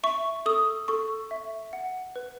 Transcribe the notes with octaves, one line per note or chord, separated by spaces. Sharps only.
E5 C#6
A4 D#6
A4 C#6
E5
F#5
B4